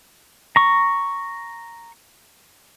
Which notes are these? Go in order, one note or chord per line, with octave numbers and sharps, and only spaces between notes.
A#5 C#6